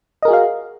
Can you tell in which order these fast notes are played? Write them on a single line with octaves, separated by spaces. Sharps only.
D#5 A#4 G#4 F#4 F5